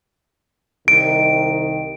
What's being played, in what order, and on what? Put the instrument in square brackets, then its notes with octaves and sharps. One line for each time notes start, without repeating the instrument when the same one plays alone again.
[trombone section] C2 D#3 [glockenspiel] D7